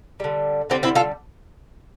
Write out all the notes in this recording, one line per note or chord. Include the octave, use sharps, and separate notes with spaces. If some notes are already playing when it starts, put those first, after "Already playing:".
D3 G3
D3 G3 C4
C4 E4
F4 A4